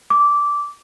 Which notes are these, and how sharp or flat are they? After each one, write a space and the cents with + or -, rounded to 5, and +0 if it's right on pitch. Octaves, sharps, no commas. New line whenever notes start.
D6 -15